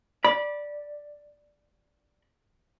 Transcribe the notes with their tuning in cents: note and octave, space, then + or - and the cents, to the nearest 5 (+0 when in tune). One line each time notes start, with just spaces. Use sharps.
D5 +0 B5 -25